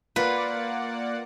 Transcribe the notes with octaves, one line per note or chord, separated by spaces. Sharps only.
A#3 F4 B4 D5 F#5